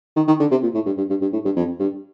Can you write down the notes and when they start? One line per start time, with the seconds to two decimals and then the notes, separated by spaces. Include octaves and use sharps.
0.16 D#3
0.28 D#3
0.40 D3
0.51 C3
0.63 A#2
0.74 A2
0.86 G2
0.98 G2
1.10 G2
1.22 G2
1.33 A2
1.45 G2
1.56 F2
1.80 G2